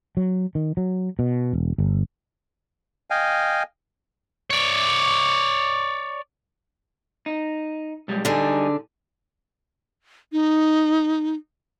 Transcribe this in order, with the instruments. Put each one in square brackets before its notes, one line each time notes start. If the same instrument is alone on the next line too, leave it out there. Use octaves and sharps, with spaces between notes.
[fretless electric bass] F#3
D#3
F#3
B2
E1
G1
[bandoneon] D#5 F5 G5 G#5
[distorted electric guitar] C#5 D5
[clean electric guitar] D#4
B1 G3 G#3
[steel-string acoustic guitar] D3 D4 [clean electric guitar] G3 D#4 G#4
[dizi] D#4